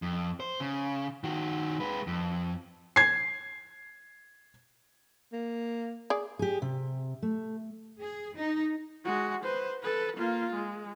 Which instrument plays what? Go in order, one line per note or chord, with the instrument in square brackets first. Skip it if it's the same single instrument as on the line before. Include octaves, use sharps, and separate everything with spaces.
[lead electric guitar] F2
C5
C#3
D#3 F#4
G#3 B4
F2
[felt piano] G#6 C7
[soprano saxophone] A#3
[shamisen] G#4 D5
[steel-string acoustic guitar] G4 G#4
C3
A3
[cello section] G#4
D#4
[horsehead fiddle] G#3 F#4
B4 C5
A4 B4
A#3 F4
G#3